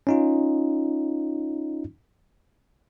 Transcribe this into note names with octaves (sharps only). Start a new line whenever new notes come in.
C#4 D#4 F4